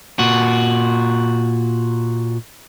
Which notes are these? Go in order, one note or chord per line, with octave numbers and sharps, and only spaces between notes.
A#2 F#4